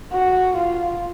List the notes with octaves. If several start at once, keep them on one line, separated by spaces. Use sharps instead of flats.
F#4
F4